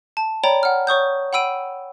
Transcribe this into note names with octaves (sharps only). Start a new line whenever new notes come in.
A5
C#5 D5 G5 A#5 B5
F#5 F6
C#5 C#6 D#6 G6
F#5 G5 B5 E6 D7 D#7